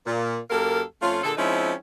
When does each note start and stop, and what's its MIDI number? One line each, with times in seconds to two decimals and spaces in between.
0.06 0.37 46
0.50 0.81 42
0.50 0.81 58
0.50 0.81 67
0.50 0.81 69
0.50 0.81 70
0.50 0.81 77
1.02 1.21 41
1.02 1.21 57
1.02 1.21 61
1.02 1.21 65
1.24 1.33 46
1.24 1.33 50
1.24 1.33 68
1.24 1.33 69
1.37 1.73 53
1.37 1.73 56
1.37 1.73 60
1.37 1.73 61
1.37 1.73 63
1.37 1.73 64